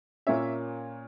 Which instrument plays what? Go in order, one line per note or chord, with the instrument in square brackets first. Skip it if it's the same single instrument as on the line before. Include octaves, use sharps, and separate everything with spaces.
[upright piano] A#2 A#3 C#4 E5